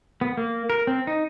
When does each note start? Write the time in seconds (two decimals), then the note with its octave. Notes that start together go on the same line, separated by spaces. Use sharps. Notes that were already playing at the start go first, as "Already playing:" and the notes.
0.21 B3
0.37 A#3
0.70 A#4
0.87 C4
1.07 D#4